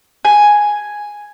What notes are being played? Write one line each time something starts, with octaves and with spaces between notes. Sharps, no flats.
G#5